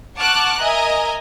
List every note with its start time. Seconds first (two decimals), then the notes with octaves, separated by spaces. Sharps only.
0.17 F#5 A5 C#6 D6 F6 F#6
0.61 A#4 D#5 E5 G#5 A#5